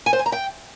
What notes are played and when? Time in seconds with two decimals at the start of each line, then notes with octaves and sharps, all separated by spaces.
0.06 G#5
0.13 C5
0.19 G#5
0.26 A#5
0.32 G5